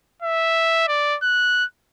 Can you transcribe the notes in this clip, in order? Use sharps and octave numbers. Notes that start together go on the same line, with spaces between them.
E5
D5
F#6